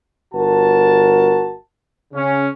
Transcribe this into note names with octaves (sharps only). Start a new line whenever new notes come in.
G1 F#4 A#4 A5
C#3 C#4